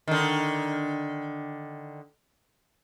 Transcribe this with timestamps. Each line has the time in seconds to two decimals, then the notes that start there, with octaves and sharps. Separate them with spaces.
0.08 D3 D#3